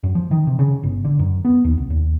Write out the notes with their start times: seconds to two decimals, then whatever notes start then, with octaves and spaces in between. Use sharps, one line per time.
0.03 F#2
0.15 F3
0.31 D#3
0.47 C3
0.59 C#3
0.83 G1
1.05 D3
1.19 F#2
1.45 B3
1.64 D#2
1.78 C2
1.90 D#2